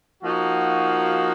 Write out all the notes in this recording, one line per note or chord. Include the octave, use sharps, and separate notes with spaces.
F3 A#3 D#4 F#4